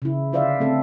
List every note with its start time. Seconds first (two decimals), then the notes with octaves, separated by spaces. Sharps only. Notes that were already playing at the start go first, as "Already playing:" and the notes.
0.02 C#3 E4
0.33 D3 F4 C5 D5 E5 F5
0.60 A3 C4 A4